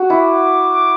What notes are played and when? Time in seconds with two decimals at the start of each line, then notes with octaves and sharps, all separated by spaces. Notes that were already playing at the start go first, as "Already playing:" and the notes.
Already playing: F#4
0.10 E4 D6